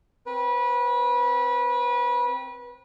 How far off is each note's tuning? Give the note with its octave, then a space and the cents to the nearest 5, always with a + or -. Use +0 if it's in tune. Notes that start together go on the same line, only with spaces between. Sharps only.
C4 +0 B4 -25